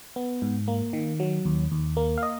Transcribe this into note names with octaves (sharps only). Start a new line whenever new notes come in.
B3
G#2
A#3
D#3
F#3
D#2
D#2
A#3
F5
D#5